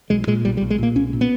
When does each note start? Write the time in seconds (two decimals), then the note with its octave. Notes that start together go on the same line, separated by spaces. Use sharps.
0.10 B1 G#3
0.27 A#2 G#3
0.45 B1 G3
0.57 G3
0.61 B1
0.70 G#3
0.78 A#2 A#3
0.95 B1 C#4
1.13 A#2
1.21 B3